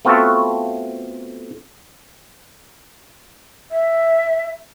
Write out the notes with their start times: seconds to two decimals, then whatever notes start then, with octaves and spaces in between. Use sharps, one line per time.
0.05 A3 B3 C4 F4 F#4 A4
3.71 E5